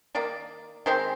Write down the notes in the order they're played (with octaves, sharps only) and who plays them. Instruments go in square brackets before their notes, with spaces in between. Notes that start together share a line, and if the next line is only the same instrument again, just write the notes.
[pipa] D#3 A#3 D5
D#3 G#3 C4 C5